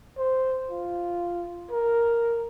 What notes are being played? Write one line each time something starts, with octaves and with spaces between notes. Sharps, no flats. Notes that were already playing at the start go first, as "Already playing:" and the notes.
C5
F4
A#4